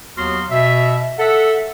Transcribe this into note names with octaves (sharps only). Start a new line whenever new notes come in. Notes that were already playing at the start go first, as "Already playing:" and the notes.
D#2 F#3 B3 F#4 C6 F6
B2 E5
A4 E5 F#5